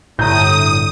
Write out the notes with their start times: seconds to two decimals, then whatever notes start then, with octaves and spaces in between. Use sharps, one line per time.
0.19 G1 A2 D3 G3 A#5 D#6 G6